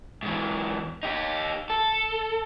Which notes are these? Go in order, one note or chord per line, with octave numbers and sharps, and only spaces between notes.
G#2 E3
D#4 G4
A4